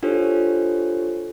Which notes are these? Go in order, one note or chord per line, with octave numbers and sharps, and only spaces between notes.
D4 F4 G4 A4 C5 C#5